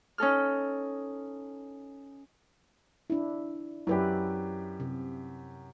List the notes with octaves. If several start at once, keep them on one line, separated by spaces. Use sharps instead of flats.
C#4 D#4 A4 F6
D4 E4
F#2 E4 G4 B4 D5
C3